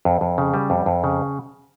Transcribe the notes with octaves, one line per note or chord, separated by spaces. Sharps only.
F2
F2
C#3
G3
F2
F2
C#3